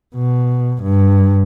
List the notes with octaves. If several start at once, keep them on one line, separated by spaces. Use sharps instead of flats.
B2
G2